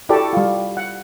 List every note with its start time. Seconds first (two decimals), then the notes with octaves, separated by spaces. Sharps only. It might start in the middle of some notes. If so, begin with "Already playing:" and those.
0.09 E4 F#4 G4 A4 D5
0.33 G3 F4
0.77 F#5